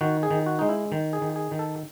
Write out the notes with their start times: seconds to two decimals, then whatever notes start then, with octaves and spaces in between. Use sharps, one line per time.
0.01 D#3 F#4
0.23 G#4
0.31 D#3
0.46 F#4
0.59 G#3 D#4
0.69 E4
0.92 D#3
1.13 G#4
1.22 D#3
1.36 G#4
1.51 D#3
1.59 A4